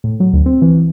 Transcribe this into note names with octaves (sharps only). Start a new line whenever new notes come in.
A2
F#3
D2
C4
E3